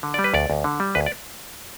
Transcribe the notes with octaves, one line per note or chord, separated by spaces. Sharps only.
D3
G3 D5
B4
D2 D5
D2
D3
G3
D2 B4
D5